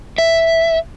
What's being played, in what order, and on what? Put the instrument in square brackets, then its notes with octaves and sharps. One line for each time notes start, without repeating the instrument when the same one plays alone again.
[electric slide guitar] E5